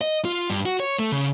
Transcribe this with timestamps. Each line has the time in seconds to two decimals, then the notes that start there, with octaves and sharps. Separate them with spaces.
0.01 D#5
0.25 F4
0.50 G2
0.66 F#4
0.80 C#5
0.99 A3
1.12 C#3